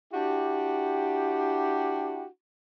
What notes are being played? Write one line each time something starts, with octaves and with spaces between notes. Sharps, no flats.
D4 E4 F#4 G4